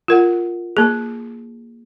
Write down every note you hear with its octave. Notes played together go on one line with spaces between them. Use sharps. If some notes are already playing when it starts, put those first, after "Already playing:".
F4 A#4 F#5
A#3 G#4